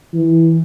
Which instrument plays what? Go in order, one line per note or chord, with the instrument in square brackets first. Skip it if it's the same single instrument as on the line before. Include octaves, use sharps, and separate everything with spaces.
[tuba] E3